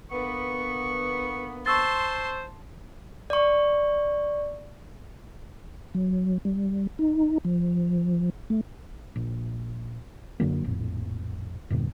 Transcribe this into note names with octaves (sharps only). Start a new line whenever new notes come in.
D3 A#3 B3 C#6
C5 A5 C6 C#6 E6 A6
D5 C#6
F#3
G3
D#4
F3
A3
A#1
F#2 D3 F#3 A#3
A#1 F2 A2
E2 G2 A#2 D3